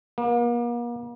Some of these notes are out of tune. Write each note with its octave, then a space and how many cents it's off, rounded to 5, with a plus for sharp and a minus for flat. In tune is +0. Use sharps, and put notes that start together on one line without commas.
A#3 +40